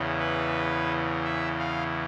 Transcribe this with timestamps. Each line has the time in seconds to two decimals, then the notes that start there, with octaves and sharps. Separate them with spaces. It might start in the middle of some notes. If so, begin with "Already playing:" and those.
Already playing: E2 C#3 E3
0.20 B4
1.24 E5
1.59 F5